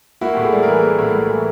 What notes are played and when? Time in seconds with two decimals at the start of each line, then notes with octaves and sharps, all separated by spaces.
0.21 A#3 E4 F#4
0.34 A2 G4
0.42 F#4 G#4
0.52 G3
0.63 E3 G#4 A#4
0.83 A#3
0.99 A2
1.14 G3
1.30 E3